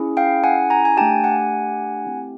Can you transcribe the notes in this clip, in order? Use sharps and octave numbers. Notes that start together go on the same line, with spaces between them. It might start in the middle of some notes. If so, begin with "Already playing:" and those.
Already playing: C#4 E4 G#4
F5 G5
F#5 G#5
G#5 A#5
G#5
A3 D4 G4 G5 A5
F#5 G#5
A3 C4 E4 G4